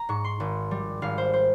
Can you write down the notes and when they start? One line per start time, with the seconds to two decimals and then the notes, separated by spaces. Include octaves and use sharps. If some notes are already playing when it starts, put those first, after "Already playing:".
Already playing: A#5
0.09 G#2 C#6
0.24 C6
0.40 G#1
0.71 G3
1.02 G#1 F5
1.18 C5
1.33 C5